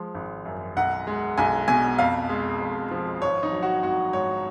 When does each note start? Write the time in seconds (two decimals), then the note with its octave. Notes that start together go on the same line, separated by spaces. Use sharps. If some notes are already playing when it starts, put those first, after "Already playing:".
Already playing: F3 G#3
0.14 G#1
0.45 F#2
0.77 B1 F#5
1.07 G#3
1.38 B1 G#5
1.68 B2 G#5
1.99 F2 F5
2.29 G#3
2.61 F2
2.91 F3
3.22 G#1 C#5
3.43 D#4
3.52 F#3
3.63 F#4
3.83 G#1 F#4
4.13 G#2 C#5